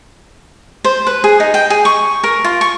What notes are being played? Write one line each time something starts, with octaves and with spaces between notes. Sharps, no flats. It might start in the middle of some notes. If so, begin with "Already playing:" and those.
C5
B4
G#4
D#4
G5
G#4
C#6
A#4
F4
C#6